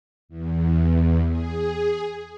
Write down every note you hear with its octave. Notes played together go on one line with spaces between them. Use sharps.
E2
G#4